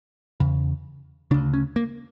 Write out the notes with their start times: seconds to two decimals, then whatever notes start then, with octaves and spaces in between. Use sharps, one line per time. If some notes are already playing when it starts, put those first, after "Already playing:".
0.40 E2 C#3
1.31 D2 C#3 D4
1.54 C#4
1.76 A#3